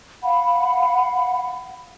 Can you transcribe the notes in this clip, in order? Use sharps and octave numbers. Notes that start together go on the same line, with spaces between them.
F5 F#5 B5